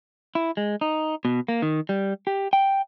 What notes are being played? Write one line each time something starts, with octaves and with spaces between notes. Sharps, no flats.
E4
G#3
D#4
B2
A#3
D#3
G3
G4
G5